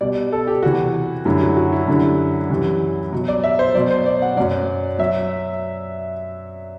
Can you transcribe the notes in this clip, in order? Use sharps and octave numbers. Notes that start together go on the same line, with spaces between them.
B2 G3 D5
A4
G4
E2 C3 E3 F#4
F#2 D3 G3 E4
F#4
F#4
E4
F#2 D3 G3
F#2 E3 G3
B2 F#3
D5
E5
C5
B2 F#3 D5
C5
D5
F#5
F#2 F#3 D5
F#3 E5